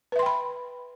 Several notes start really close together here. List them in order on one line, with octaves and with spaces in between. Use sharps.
B4 E5 C6 G5 B5